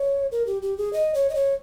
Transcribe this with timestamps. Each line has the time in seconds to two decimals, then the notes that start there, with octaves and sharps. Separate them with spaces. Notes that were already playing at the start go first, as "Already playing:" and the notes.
Already playing: C#5
0.32 A#4
0.47 G4
0.62 G4
0.78 G#4
0.93 D#5
1.14 C#5
1.30 D#5
1.35 C#5